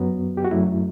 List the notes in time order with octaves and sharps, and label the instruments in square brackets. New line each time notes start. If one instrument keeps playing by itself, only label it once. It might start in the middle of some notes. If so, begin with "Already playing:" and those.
Already playing: [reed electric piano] F#2 F#3 B3
G4
F#4
F#2 F#3 A3 E4